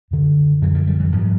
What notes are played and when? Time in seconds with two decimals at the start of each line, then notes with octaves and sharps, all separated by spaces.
0.11 F#2 D3
0.62 F#2 D3 E3 F#3
0.75 F3 G3
0.87 F3 G3
1.00 E3 F#3
1.12 G#2 F3 G3